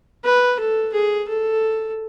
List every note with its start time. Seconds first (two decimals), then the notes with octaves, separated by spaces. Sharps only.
0.24 B4
0.59 A4
0.93 G#4
1.28 A4